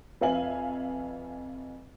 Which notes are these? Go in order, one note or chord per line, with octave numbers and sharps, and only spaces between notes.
F2 B4 E5 F5 G#5 F#7